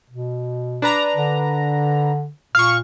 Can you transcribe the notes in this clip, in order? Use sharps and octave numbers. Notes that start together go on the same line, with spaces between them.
B2
D4 B4 A#5
D3
A#2 F5 C#6 F6